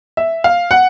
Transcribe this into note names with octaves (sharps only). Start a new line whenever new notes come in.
E5
F5
F#5